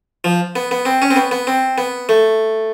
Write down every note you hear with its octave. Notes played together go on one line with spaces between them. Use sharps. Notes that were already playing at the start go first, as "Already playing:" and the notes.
F3
B3
B3
C4
C#4
C4
B3
B3
C4
B3
A3